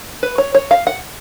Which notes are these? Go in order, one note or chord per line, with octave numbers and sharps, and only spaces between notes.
B4
C#5
C#5
F5
F#5